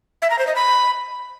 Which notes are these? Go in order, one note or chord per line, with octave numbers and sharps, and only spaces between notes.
E5
A#5
C5
D#5
B5